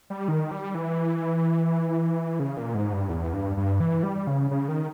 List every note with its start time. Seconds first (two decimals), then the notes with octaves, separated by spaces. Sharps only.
0.10 G3
0.28 D#3
0.51 G3
0.75 E3
2.40 C#3
2.57 A#2
2.75 G#2
2.93 G2
3.10 E2
3.33 G2
3.57 G2
3.80 E3
4.03 G3
4.27 C#3
4.51 C#3
4.68 D#3